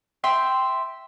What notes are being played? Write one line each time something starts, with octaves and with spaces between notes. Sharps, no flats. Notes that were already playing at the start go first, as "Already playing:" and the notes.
E5 G5 C6